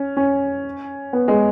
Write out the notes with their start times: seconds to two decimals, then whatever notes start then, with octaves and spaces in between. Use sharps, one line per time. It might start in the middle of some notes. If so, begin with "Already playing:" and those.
Already playing: C#4
0.17 C#4
1.13 B3
1.28 G#3